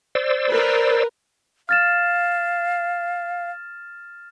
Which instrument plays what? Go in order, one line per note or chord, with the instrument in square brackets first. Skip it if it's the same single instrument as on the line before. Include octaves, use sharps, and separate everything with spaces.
[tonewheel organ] C5 D5 E6
[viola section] A#4 B4
[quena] F5 [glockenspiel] F6 A6 E7